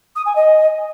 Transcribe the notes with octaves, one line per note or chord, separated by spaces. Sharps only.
D#6
G#5
D#5